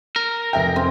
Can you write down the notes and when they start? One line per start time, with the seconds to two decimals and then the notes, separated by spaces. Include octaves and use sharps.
0.16 A#4
0.53 F1 E5 G5
0.76 C4